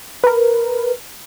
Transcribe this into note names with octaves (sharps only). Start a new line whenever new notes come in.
A#4 B4